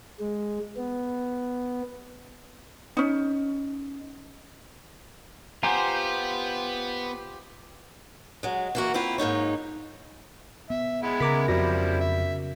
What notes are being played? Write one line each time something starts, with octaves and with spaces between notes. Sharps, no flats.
G#3
B3
C#4 D#4
B3 F4 G4 C5 F#5 G#5 A#5
F#3 G#3
E3 A#3 F#4
A#3 C4 E4 F4
G#2 A#3 D#4 C#5
B3 E5
G#3 B3 E4
C#3 A#4 A#5 D6 B6
F2 C#3 F3 G3 E4 F#4 A#6
E5